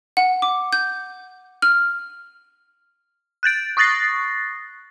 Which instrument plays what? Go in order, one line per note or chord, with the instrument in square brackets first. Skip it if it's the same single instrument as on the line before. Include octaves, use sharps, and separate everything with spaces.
[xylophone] F#5
D6
G6
F6
[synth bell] F#6 G6 A6 D7
C#6 D#6 F#6 A6 A#6 C7